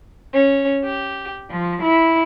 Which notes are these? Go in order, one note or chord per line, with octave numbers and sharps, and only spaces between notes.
C#4
G4
F3
E4